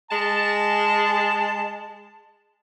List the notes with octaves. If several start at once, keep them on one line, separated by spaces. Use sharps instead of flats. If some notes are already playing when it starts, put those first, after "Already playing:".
G#3 A5